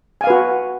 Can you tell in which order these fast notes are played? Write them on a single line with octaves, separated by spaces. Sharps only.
G#5 F5 B4 F#4